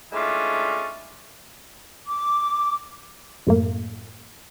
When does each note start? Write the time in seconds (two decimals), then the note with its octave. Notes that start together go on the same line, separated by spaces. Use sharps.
0.12 G#3 A3 C#4 D4 E4 F4
2.08 D6
3.47 F#2 A2 A#3